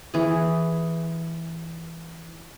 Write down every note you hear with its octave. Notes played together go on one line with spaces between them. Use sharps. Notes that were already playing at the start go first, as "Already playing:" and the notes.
E3 G#4